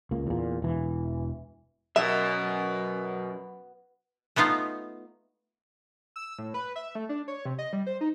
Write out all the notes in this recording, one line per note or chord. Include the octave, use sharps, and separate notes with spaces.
C#2 A#3
E2 A#2
E1 E3
F#2 B2 A#4 E5
A3 B3 D#4 F4 F5
E6
A2
B4
E5
A3
D4
C#5
C3
D#5
G3
C5
D#4